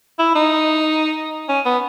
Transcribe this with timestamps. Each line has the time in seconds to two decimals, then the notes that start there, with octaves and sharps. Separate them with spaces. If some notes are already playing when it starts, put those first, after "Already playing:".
0.19 E4
0.35 D#4
1.49 C#4
1.66 B3